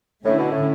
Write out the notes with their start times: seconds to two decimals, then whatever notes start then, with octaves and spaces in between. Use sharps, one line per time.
0.24 A2 D3 A3 C#4 E4
0.38 B2
0.51 A2